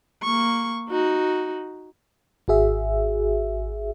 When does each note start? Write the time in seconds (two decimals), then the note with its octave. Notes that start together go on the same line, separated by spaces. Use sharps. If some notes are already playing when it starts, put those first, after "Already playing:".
0.23 A#3 C#6
0.89 D#4 F#4
2.48 G#1 F#4 G#4 E5